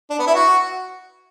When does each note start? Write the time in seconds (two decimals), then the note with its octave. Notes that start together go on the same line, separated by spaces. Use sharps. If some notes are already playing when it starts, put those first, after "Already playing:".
0.10 D4
0.19 B3
0.27 E4
0.34 F#4